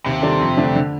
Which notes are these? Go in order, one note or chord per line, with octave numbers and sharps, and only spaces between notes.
D#2 C3
D#3 G3 D4 A4
F2
D3 A3 D4
D3